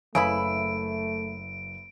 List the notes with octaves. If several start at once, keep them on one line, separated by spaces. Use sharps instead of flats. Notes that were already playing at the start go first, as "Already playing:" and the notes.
F#1 C#3 A3 E4 B4 B5 D7